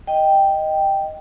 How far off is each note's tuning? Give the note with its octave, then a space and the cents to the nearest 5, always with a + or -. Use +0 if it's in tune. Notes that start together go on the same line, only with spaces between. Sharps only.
D#5 +0 G5 +0